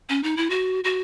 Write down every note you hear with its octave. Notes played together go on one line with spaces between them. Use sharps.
C#4
D#4
E4
F#4
F#4